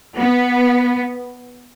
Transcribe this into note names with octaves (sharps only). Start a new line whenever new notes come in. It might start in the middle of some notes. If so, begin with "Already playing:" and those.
B3